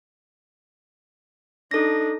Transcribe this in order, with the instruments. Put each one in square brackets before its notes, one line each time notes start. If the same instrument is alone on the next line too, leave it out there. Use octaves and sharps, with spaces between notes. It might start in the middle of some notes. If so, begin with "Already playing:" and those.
[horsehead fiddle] D4 D#4 [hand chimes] A4 A#6